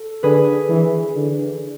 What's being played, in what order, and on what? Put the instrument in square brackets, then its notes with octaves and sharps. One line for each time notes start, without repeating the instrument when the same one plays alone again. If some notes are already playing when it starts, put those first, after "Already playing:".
Already playing: [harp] A4
[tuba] D3 [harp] G#4 B4
[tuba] E3
D3